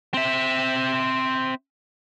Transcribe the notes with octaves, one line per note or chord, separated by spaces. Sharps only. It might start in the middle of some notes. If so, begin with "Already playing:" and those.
C4 E5